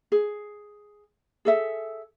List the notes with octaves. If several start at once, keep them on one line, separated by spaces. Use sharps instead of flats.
G#4
G#4 A4 E5